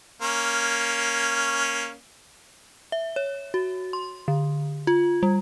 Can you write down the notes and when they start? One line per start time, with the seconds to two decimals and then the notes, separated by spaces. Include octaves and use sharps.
0.22 A#3 C#4
2.92 E5
3.16 C#5
3.54 F#4
3.93 C6
4.28 D3
4.87 F4
5.23 G3